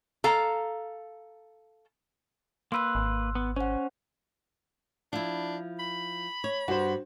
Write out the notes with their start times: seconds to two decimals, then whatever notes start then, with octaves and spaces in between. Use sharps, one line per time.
0.24 A4 F5 A#5
2.72 A#3 B4 C6 E6 F#6
2.95 G#1
3.35 B3
3.56 C#4 C5 F#5
5.13 F3 D4 E4
5.80 B5
6.44 C#5
6.68 G2 F#4 C5